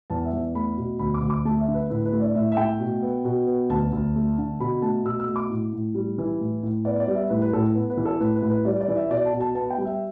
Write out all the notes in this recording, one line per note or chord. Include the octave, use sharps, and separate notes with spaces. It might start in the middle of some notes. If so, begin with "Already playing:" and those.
E2 A5
E5
E2
A3 B5
B2
D2 B5
D6
D2
D6
A3 A5
E5
D3
B4
A2 B4
B4
A3
D5
A2 E5
E5
A3 G5
B2
B3
B2
B3
D2 A5
D2
A3
D3
B2 B5
A3 A5
B2 E6
E6
A3
D6
A2
A2
G3
E3
A2
A2
B3 D5
D5
G3
E5
A2 B4
B4
A2 A4
B3
B4
E3
A4
A2 B4
B4
A2
B4
G3 D5
D5
E3
E5
B2 D5
A5
B2
A5
B3 A5
G5
G3
E5